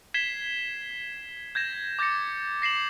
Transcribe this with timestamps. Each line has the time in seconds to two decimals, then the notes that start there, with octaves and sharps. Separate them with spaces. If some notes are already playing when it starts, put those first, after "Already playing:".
0.14 G#6 B6 C7 E7 G7
1.55 G6 G#6 A#6 E7
1.99 D6 G6 A6 A#6 C#7
2.62 A#6 C7 E7 F#7